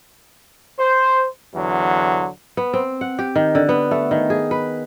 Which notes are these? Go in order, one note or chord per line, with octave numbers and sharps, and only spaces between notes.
C5
E2 D3 F#3
B3
C4
F#5
G4
D#3
D3
B3
A3
D#3
G#4
B4